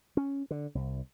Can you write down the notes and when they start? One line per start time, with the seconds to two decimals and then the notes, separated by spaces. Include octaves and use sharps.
0.17 C#4
0.51 D3
0.75 C2